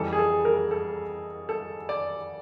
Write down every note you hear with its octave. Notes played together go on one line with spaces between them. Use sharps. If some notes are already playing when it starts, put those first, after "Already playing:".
Already playing: F2 C#3 E3 G3 A4
G#4
A4
A#4
A4
A4
D5